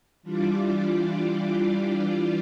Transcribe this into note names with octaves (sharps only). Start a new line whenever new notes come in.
E3 G3 D4 F4 D5